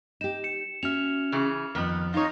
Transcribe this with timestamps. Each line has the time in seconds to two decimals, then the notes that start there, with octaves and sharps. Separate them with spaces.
0.21 D#4 G4 E7
0.44 C#7 E7
0.83 C#4 F#4 E5 F6 F7
1.32 C#3 E3 G#4
1.75 F2 D#3 F3 B3
2.14 D#4 F4 C#5